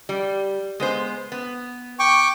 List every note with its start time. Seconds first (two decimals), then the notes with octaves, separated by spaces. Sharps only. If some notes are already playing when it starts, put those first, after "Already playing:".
0.09 G3
0.80 G#3 B3 C5
1.32 B3
1.99 G5 C#6 D6